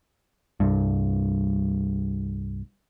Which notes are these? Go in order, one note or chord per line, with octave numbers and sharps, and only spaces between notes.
C2 G2